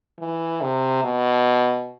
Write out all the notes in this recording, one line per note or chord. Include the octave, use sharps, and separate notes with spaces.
E3
C3
B2